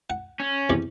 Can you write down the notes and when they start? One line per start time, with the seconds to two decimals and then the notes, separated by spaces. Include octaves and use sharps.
0.10 F#5
0.40 C#4
0.70 E2 C3 D5